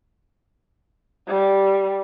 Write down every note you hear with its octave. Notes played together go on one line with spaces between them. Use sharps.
G3